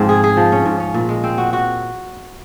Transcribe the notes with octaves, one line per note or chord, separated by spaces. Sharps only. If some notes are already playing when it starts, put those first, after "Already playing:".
Already playing: G#2 F3 C4 F4
G#4
G#4
F3
C#4
G#2
C#4
A#2
G#3
C4
F#4
F#4